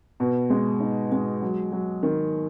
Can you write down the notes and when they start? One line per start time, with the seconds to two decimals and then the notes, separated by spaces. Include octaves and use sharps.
0.20 B2
0.50 G#3
0.80 D#4
1.12 G#3
1.42 F#3
1.72 F#3
2.03 D#3